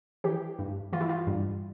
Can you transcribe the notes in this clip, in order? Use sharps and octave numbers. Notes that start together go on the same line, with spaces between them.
E3 G4
G2
E3 F4
E4
F4
G2